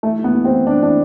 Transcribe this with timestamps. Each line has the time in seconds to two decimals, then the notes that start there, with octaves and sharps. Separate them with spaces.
0.03 E3 A3
0.19 E3
0.24 B3
0.34 E3
0.45 C4
0.51 E3
0.67 E3 D4
0.82 E3 D4